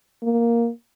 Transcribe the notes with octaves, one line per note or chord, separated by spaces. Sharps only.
A#3